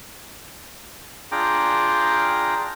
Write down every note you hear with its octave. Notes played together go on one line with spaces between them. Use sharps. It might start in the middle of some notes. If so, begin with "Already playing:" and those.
D4 F4 G#4 G5 A#5 D6